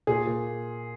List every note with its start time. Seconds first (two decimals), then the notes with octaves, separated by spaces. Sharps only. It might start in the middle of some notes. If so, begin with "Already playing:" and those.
0.07 A#2 G#4
0.27 A#2